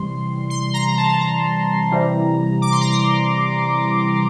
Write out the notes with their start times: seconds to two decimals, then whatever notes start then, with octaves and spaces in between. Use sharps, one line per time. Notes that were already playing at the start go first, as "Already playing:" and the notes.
Already playing: C3 E3 G3 C6
0.50 C6
0.74 A#5
0.86 A#5
0.97 A5
1.09 A5
1.20 A#5
1.91 C3 E3 G3
2.62 D6
2.72 C6
2.81 A#5
2.91 C6